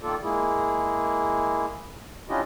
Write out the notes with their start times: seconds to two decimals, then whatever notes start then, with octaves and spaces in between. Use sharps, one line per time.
0.03 D#3 A#3 F4 A4 D5
0.23 G#3 A#3 E4 G#4
2.29 C#4 D4 E4 F4 G4 D#5